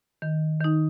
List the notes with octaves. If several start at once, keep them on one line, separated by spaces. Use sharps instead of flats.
D#3
D#3 D#4